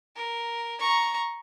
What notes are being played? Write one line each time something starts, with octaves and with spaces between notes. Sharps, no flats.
A#4
A#5 C#6